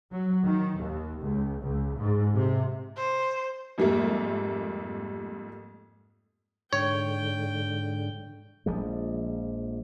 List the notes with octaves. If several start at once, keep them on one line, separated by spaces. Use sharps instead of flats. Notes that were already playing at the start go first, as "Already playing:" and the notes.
F#3
D#3
D#2
C#2
C#2
G#2
C3
C5
F2 G#2 G3 A3 A#3
G#2 D3 C#5 G5
A#1 F3 G#3